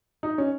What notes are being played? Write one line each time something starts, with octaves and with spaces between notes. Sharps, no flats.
D#4
C#4